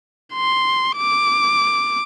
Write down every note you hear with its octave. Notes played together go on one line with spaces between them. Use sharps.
C6
D6